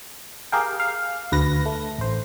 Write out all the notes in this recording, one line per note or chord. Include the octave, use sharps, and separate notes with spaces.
G4 G#4 A#4 F5 G5
F5
D2 B4 A#6
A3
A1 C5